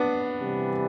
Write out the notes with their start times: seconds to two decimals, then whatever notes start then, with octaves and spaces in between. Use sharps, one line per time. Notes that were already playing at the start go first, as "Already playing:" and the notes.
Already playing: B3 D4
0.40 C3 E3 G3